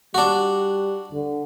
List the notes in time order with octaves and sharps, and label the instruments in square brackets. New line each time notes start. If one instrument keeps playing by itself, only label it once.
[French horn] G3 [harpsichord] D4 F#4
[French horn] D3